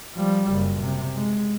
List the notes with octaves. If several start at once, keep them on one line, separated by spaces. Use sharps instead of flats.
F3 G3
F#1
C3
G#3